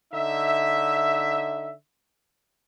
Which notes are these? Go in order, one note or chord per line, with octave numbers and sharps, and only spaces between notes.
D3 D#4 E5